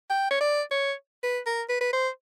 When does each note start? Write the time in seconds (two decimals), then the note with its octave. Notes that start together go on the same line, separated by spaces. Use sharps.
0.10 G5
0.31 C#5
0.41 D5
0.71 C#5
1.24 B4
1.47 A#4
1.69 B4
1.81 B4
1.93 C5